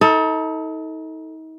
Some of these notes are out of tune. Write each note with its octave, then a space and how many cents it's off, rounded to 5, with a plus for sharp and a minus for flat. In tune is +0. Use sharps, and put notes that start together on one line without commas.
D#4 +40 A4 +10